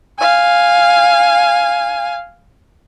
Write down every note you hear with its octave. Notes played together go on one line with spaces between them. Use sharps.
F5 G#5